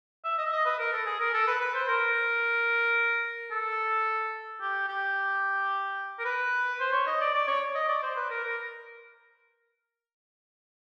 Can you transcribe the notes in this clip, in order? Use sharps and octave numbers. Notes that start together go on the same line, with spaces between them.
E5
D#5
E5
D#5
B4
A#4
A4
G#4
A#4
A4
B4
B4
C5
A#4
A4
G4
G4
A#4
B4
C5
C#5
D#5
D5
D5
C#5
D#5
D5
C5
B4
A#4
A#4